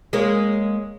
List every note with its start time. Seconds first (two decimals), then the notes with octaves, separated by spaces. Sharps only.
0.13 G#3 A#3 C#4